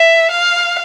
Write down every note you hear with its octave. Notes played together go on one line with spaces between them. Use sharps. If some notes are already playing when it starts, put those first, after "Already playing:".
Already playing: E5
F5